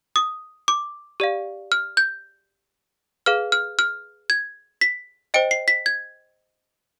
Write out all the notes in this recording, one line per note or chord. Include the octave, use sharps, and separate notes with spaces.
D#6
D6
G4 D5 F5
F6
G6
G#4 B4 F5 F6
F6
F6
G#6
B6
C5 D#5 G5 D7
C7
B6
G#6